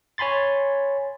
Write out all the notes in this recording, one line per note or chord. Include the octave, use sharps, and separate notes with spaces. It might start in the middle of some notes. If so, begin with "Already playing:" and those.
C#5 G#5 B5 C6 A6